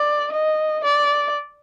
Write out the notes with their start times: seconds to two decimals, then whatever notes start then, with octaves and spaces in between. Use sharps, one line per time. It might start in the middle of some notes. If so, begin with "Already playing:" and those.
Already playing: D5
0.32 D#5
0.84 D5